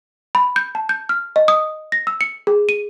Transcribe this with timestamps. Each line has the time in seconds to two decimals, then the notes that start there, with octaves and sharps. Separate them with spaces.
0.35 B5
0.56 G6
0.75 A5
0.89 G6
1.09 F6
1.36 D#5
1.48 D#6
1.92 A#6
2.07 E6
2.21 C#7
2.47 G#4
2.69 D#7